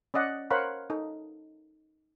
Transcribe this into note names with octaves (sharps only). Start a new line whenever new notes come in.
C#4 D5 D#5 F#5
A#4 C5 C#5 F5 F#5 B5
D#4 A4